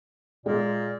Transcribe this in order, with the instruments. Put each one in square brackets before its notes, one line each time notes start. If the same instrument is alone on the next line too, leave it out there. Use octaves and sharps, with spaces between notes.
[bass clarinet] A#2 [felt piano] G#3